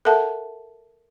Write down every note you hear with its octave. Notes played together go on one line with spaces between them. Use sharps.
A4 A#4 E5 F#5 A5